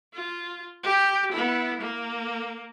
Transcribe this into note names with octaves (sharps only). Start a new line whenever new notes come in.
F4
G4
B3 E4
A#3